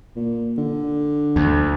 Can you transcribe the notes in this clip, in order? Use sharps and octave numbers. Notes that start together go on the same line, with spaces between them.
A#2
D3
D2